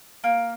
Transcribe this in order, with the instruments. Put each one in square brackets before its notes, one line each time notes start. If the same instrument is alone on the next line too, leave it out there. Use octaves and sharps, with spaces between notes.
[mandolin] A#3